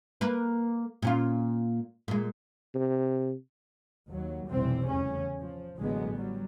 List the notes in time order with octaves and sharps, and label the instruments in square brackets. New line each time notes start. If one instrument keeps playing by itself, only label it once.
[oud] A#3 A#4 B4
A#2 C#4 F4
A#2 G#3
[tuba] C3
[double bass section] D#2 F#3
F1 B1 B2 E3 G3 C4
E2 A2 C#3 C#4
F3
A1 D3 F#3 G#3 B3
F#3 G3